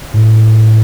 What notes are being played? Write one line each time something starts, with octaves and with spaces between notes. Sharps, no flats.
A2